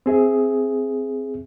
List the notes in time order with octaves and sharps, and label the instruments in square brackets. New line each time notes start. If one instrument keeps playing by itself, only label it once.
[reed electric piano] C4 G#4 E5